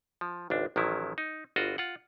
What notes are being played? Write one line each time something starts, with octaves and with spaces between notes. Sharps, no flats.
F3
G#1 C#2 D4
A1 D#3 F3 F#3 E4
D#4
G1 F4 F#4 D#5
F4 F#5